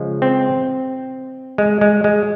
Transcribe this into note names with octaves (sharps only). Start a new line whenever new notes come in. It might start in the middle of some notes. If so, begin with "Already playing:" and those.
Already playing: C#3 F3 G#3
C4
G#3
G#3
G#3